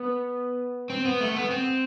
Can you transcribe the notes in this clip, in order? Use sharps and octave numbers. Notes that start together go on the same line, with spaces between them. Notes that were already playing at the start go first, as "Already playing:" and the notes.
Already playing: B3
C4
B3
A3
B3
C4